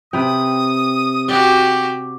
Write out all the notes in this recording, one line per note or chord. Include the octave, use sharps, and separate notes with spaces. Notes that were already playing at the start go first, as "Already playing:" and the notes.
C3 B4 G5 D#6
F#4 G4 D5 F#5